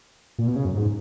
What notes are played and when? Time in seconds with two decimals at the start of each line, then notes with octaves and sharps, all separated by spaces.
0.39 A#2
0.47 B2
0.56 C#3
0.65 F#2
0.74 G#2